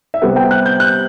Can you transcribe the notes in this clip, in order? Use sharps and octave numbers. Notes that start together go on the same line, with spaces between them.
E5
C3 G3 B3 F#5
G5
F#6
G6
F#6